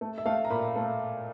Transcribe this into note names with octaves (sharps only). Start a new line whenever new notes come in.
A3
E5
A3 F5
A#5
A#2 B5
A3